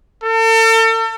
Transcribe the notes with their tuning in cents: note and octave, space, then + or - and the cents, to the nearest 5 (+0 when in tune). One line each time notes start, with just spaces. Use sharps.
A4 +40